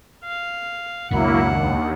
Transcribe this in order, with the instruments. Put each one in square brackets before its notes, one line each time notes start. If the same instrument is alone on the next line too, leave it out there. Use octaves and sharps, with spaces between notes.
[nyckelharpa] F5
[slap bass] C#2 F#2 B2 [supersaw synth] F#3 A#3 E4 [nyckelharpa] D4 F#5
[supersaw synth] D#2